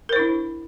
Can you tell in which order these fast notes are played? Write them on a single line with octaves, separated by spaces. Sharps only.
A#4 C5 E4 D4